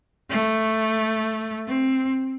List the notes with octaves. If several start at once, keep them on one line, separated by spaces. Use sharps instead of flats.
A3
C4